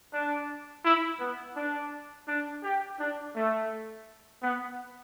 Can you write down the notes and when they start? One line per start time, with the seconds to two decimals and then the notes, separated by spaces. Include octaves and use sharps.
0.12 D4
0.84 E4
1.19 B3
1.55 D4
2.28 D4
2.63 G4
2.99 D4
3.35 A3
4.42 B3